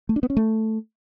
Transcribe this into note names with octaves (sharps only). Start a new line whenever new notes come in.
A3
D4
B3
C#4
A3